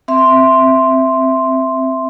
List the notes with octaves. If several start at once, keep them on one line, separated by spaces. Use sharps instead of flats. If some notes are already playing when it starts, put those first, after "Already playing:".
C4 E5 C6